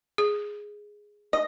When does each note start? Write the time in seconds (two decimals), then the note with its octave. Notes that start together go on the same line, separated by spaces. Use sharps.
0.18 G#4
1.33 D#5